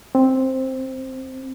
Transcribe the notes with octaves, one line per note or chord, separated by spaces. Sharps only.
C4